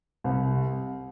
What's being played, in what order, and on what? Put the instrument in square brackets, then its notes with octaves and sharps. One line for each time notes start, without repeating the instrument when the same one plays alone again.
[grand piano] C2